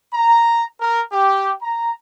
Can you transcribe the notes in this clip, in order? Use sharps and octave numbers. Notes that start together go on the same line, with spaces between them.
A#5
A#4
G4
A#5